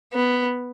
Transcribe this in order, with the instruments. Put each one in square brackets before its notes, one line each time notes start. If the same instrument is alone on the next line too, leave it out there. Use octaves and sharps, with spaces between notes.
[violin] B3